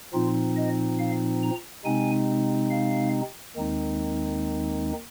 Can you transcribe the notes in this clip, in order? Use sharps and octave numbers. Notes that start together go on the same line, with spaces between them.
A#2 F3 C4 D#4 F4
D#5
F5
A#5
C3 G#3 C4 D#4 G#5
F5
D#2 D#3 G#3 C4 D#4